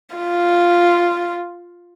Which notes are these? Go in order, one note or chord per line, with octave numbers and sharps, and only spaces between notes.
F4